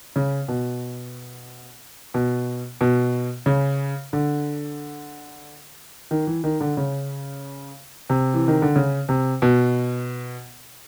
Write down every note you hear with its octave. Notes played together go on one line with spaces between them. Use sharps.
C#3
B2
B2
B2
C#3
D3
D#3
E3
D#3
D3
C#3
C3
E3
D#3
D3
C#3
C3
B2